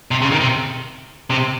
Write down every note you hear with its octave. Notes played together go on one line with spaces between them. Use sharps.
C3
C#3
D#3
C3
C3